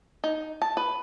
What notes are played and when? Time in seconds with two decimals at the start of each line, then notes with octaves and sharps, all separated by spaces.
0.24 D#4
0.62 A5
0.77 B4